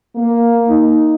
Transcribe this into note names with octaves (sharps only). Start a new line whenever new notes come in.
A#3
D#4